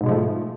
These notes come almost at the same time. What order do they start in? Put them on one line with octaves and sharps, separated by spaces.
G#2 B2 G#3 F3 A3